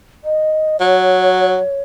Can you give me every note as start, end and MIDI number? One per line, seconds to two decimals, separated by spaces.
0.24 0.80 75
0.80 1.59 54
0.80 1.82 73